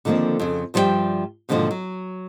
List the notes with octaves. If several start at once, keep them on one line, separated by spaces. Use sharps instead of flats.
D3 D#3 F3 G3 A#3 C4
F2 C#3
G2 F3 G3 E4 E5 G5
G#2 B2 D3 D#3 F3 A#3
F#3